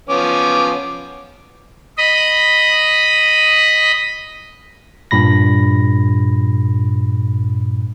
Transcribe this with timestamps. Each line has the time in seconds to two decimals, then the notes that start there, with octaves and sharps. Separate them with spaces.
0.09 F3 B3 C#4 D6
1.98 D#5 B5
5.11 G2 A#2 B5 A#6